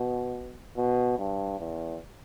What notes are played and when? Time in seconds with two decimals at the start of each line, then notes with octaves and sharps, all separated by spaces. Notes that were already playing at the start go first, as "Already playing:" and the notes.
Already playing: B2
0.77 B2
1.19 G2
1.59 E2